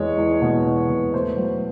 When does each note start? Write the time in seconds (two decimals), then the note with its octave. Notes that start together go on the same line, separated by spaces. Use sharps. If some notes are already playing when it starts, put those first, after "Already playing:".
Already playing: E2 G#3 C#5
0.18 E2
0.42 B2
0.65 E2
0.89 B2
1.13 A3 C5
1.37 F#3